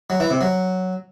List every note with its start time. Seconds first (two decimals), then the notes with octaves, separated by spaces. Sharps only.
0.10 F#3
0.20 E3
0.30 C3
0.41 F#3